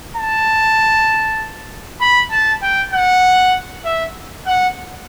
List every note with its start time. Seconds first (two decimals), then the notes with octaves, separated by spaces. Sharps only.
0.17 A5
2.01 B5
2.31 A5
2.63 G5
2.93 F#5
3.85 E5
4.47 F#5